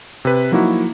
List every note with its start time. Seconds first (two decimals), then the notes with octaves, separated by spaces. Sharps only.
0.25 C3 B4
0.51 F3 F#3 A#3 D#4 E4 F#4